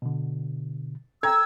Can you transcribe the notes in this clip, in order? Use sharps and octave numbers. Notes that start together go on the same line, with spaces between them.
B2 D3
A4 G5 A#5 E6 G#6